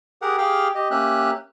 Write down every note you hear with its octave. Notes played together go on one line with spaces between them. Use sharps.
G4 G#4 A#4 F#5
G4 G#4 F5 G5 F6
G4 D#5
A#3 C#4 G4 E5 F#6